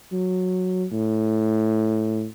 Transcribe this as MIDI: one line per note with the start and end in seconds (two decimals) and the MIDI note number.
0.12 0.86 54
0.92 2.27 45